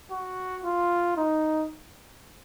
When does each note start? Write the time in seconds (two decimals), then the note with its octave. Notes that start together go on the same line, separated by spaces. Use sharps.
0.11 F#4
0.64 F4
1.17 D#4